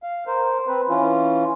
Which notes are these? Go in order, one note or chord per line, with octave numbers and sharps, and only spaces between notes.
F5
A#4 C5
C4 B4
E3 C#4 F4